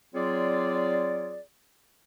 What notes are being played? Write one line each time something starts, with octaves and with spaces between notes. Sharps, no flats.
F#3 C4 F4 G#4 C#5 D5